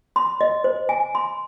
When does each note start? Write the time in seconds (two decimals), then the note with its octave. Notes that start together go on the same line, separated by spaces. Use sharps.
0.16 C6
0.41 D#5
0.64 C5
0.89 G#5
1.15 C6